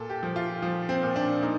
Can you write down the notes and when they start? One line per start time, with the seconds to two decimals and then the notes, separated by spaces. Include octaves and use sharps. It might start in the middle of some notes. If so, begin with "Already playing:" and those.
Already playing: A#2 A4
0.10 G4
0.23 F3
0.36 F4
0.62 F3
0.89 C4
1.03 A#2
1.16 D4
1.42 A#2 D#4